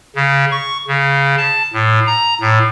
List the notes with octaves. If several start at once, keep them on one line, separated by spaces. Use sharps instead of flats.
C#3
C#6
C#3
A5
A2
A#5
A2